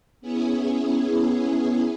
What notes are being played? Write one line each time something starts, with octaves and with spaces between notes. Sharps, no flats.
B3 C#4 E4 G#4